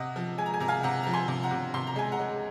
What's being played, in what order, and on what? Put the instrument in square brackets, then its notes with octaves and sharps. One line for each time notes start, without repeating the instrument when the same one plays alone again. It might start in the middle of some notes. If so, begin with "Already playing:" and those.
Already playing: [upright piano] C3 D#5 F#5
F3
G#3 G#5
A#5
G#5
C3 A#5
F5 G#5
C3 F#5 A#5
F3 A#5
G#5 C6
C3
F#5 A#5
C3
C3 C6
A#5
G#3 G#5
F#5 A#5
G#3